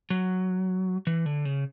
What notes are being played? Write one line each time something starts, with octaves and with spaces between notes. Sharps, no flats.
F#3
E3
D3
C#3